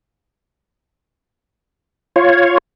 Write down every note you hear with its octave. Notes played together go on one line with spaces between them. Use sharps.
F4 C#5